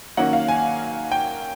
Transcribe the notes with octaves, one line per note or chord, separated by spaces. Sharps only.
D#3 F#3 A#3 C#4 F#5
F5
G#5
G5